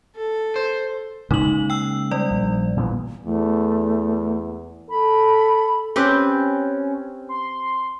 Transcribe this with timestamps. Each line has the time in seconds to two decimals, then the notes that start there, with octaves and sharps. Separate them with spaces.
0.16 A4
0.56 C5
1.31 C#3 G#3 A#3 D#4 F#7
1.70 G5 E6
2.11 G3 D5
2.30 A#1
2.77 A#2 E3 B3
3.26 E2 A3
4.90 A4 B5
5.96 C4 C#4 G4 B4
7.29 C6